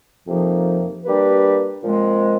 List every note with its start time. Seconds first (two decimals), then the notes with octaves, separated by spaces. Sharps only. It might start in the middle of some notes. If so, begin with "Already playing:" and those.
0.26 F2 C3 F3 A#3 D#4
1.04 G3 A#3 D4 G4 B4
1.82 A#2 F3 G#3 C4